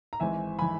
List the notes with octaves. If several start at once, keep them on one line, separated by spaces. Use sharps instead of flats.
A#5
G#1 G#2 E3 E5 G#5
E3 G#5 B5